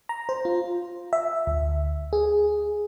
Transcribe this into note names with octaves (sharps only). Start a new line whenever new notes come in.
A#5
C5
F4
E5
D2
G#4